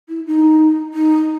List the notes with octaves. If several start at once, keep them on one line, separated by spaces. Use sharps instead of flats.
E4
D#4
D#4